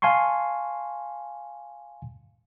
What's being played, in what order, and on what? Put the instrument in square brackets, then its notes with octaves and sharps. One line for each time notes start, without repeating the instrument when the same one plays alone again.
[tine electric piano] F5 G#5 A5 C6 C#6